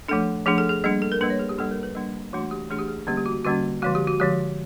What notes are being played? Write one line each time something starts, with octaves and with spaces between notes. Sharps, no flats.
F3 A3 D4 A4
F3 A3 D4 G#4
A4
G#4
G3 A#3 D4 G#4
A4
A#4
G3 A#3 D4 B4
C#5
G#4
G4
G3 A#3 D4 A4
A#4
B4
G3 A#3 D4
E3 A3 D4 F#4
G4
E3 A3 D4 G#4
G4
G#4
D3 G3 A#3 C#4 G4
G4
F#4
D3 G3 A#3 C#4 F#4
D3 F3 G#3 F#4
G4
F#4
D3 F3 G#3 G4